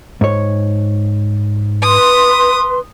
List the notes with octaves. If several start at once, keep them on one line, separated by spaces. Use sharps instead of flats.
G#2 C#5
B4 C6 D#6